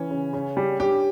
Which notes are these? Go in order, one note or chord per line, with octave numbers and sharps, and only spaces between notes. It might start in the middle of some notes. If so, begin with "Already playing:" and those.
Already playing: E3 C#4
C#3
C#3
G3
G3 G4